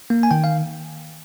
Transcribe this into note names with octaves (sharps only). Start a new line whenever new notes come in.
A#3
G#5
D#3 G5
F5